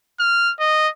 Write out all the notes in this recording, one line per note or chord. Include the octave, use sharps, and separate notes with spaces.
F6
D#5